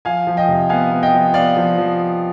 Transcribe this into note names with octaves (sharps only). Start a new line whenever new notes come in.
F3 F5 G#5
F3
D#5 G5
C3
B3 F5 G#5
B3
D#5 G5
F3
B3 D5 F5
F3
F3